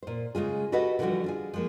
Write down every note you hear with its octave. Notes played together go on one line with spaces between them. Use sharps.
A#2 C5
C#3 G#3 F4 G#4
F#4 G4 A4 B4 D#5 F#5
D3 E3 F3 G3 F4 F#4
D4 F4 G#4
F3 G#3 A#3